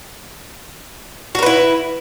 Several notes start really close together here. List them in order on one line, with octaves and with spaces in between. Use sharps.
F#4 A#4 B4 E4